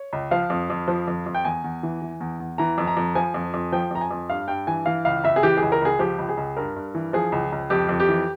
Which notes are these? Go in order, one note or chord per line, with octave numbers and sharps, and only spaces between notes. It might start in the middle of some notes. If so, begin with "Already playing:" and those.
Already playing: C#5
C#2
F3 F5
F2
F2
F3
F2
F2
G5
E2 G#5
E2
E3
E3
E2
E2
E3 A#5
F2
A#5
F2
F3 G#5
F2
F2
F3 G5
F2 A#5
G#5
F2
G2 F5
G2 G5
E3 G#5
E3 F5
C#2 F5
C#2 E5
G#4
E3 G4
G#4
C#2
A#4
C#2 G#4
F3 G4
C#2
G#4
C#2
G2 A#4
G2
E3
F3 G#4
C#2
C#2
F2 G4
F2
G4
E3